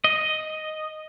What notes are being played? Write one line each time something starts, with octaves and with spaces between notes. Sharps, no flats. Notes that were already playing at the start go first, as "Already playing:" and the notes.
D#5